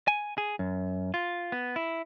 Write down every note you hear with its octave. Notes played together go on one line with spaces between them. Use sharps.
G#5
G#4
F#2
F4
B3
E4